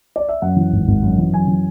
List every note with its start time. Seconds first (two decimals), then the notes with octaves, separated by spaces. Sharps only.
0.16 D5
0.29 E5
0.42 F#2 F#5
0.56 E3
0.72 G#1
0.88 G#1
1.02 F#2
1.18 E3
1.33 F#2 G#5
1.48 E3